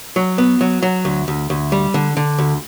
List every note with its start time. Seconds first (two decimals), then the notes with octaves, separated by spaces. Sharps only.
0.16 F#3
0.38 B3
0.61 F#3
0.83 F#3
1.05 D2
1.28 D2
1.50 D2
1.72 G3
1.94 D3
2.17 D3
2.39 D2